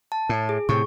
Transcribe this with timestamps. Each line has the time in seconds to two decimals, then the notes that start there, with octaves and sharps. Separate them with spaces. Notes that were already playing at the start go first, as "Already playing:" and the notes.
0.12 A5
0.29 A2
0.49 G#4
0.69 A2 C3 C#6